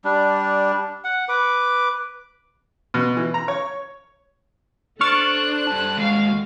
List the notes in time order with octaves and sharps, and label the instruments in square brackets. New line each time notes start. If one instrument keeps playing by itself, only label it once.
[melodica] G3 D4
F#5
B4 D6
[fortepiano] B2
E3
A#5
C#5
[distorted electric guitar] D4 [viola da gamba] A4 C5 [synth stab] C#6 F6 A6 [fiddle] F#6
[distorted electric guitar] G3 A5
[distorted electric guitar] D#2 G#3 [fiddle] F#4 F5